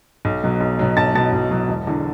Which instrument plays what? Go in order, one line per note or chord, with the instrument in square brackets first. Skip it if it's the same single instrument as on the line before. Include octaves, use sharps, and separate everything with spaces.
[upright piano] B1
B2 F#3
B1
B2 F#3
B1 A5 A6
B2 F#3 A5 A6
B1
B2 F#3
E1
E2 D3